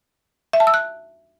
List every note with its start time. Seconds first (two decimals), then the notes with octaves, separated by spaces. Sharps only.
0.53 E5
0.60 A5
0.67 E6
0.74 F#6